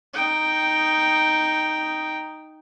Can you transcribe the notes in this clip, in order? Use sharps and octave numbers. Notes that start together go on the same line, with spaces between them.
D#4 G5